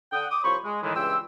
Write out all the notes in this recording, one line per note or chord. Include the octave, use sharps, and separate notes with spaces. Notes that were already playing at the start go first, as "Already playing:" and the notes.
D3 F#5 G5 D#6
D6 D#6
C2 F3 C5 C#5 B5 C#6
G#3
A2 D#3 E3 G#3
C#2 G2 E3 G5 C6 E6